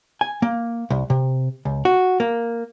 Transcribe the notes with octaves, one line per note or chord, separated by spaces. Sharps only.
G#5
A#3
C2
C3
C#2
F#4
A#3